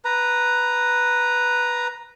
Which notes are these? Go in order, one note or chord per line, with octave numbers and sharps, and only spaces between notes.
B4 A#5